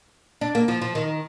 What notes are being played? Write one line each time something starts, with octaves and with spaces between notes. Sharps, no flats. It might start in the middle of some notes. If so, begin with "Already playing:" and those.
D4
A#3
F3
F3
D#3